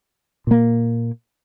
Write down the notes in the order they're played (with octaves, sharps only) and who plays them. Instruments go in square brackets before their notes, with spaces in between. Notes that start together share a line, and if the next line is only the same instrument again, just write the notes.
[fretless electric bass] A#2 A#3